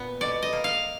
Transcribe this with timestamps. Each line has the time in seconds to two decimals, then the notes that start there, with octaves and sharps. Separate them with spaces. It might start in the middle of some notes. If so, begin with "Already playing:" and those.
Already playing: A#2 B3 B4
0.21 B2 D5
0.42 D#5
0.53 A#3
0.64 F5